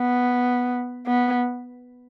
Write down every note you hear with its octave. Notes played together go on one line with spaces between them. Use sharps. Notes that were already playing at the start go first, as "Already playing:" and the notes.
Already playing: B3
B3